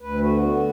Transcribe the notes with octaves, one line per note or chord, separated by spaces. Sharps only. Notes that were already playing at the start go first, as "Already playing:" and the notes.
D2 B4
D3 F#4
B3 F#4